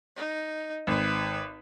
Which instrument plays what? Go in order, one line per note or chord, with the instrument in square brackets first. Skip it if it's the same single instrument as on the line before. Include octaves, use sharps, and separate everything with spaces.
[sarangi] D#4
[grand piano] G#1 [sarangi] B4